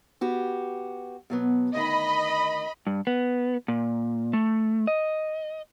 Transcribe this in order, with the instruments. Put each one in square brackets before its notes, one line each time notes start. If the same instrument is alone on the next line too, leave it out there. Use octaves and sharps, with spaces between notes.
[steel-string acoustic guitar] B3 F#4 G4
B2 F#3 B3
[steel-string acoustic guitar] D2 D#3 [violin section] D#5 B5
[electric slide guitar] G2
B3
A#2
A3
D#5